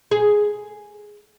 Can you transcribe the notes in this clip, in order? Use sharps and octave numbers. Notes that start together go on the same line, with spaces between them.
G#4